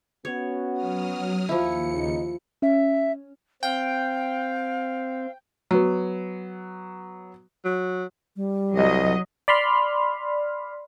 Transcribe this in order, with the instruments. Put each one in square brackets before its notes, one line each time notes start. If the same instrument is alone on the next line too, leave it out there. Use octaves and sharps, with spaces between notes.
[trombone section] B3 C#4 F#4 [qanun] C#5
[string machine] F#3 D#6 F6
[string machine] D#2 C#7 [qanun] F3 E4
[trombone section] C#3 D#4
[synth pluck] C#4 [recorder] E5
[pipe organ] C4 [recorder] F5 [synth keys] G5
[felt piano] F#3 B3
[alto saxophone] F#3
[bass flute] G3
[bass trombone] C2 [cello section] F#3 D#5
[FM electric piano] D5 B5 C6 F6